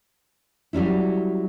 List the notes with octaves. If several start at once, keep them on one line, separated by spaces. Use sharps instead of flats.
F#3 G3 C#4 E4